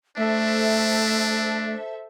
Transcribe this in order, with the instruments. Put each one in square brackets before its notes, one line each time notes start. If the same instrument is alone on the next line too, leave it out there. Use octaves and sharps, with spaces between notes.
[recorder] A3 [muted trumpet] D4 [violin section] A4 C5 E5